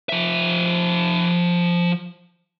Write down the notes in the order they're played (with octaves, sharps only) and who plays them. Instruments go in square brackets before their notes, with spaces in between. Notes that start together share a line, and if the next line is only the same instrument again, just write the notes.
[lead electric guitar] F3 E5